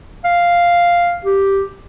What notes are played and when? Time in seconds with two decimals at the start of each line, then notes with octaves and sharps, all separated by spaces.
0.24 F5
1.25 G4